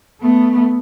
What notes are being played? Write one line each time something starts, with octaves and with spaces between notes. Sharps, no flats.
A3 B3